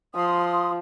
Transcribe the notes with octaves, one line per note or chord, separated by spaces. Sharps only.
F3 C6 D#6